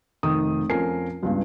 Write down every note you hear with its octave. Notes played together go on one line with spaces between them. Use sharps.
F1 D#3 D#6
F2 F3 C#4 A#4 G#5 C7
C#2 G2 B3